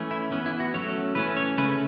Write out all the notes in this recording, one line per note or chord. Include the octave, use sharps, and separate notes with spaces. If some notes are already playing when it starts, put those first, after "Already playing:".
Already playing: E3 A3 C#4
E4
E3 B3 C#4
E4
F#4
F#3 A3 C#4 C#5
E3 A3 C#4 B4
C#5
C#3 A3 C#4 B4